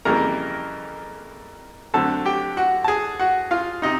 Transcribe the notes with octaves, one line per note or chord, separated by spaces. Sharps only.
F2 C#3 E3 G3 A#3 A#4 A#5
D3 F#3 A3 C4 A4 A5
G4 G5
F#4 F#5
A5
G#4 G#5
F#4 F#5
F4 F5
C3 D#4 D#5